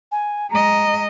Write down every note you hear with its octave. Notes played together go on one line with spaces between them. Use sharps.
G#5
G#3 D#5 A#5